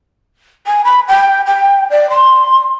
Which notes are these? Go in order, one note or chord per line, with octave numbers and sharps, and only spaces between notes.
G#5
B5
G5
G5
D5
C6